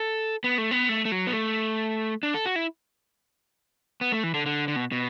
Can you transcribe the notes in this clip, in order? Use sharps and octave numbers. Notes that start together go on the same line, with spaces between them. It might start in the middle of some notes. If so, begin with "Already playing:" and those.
Already playing: A4
B3
A3
B3
A3
A3
F#3
B3
A3
D4
A4
F#4
E4
B3
A3
E3
D3
D3
D3
B2
B2